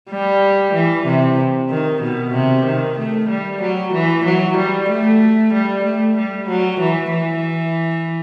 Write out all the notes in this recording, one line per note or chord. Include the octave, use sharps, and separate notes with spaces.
G3
E3
C3
D#3
B2
C3
D#3
A3
G3
F#3
E3
F#3
G3
A3
G3
A3
G3
F#3
E3
E3